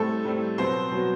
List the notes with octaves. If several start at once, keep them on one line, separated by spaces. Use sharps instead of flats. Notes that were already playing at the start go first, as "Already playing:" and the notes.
Already playing: A2 G3 A3 C4 A4
A2 G3 C4
B2 F#3 B3 C4 C5
B2 F#3 B3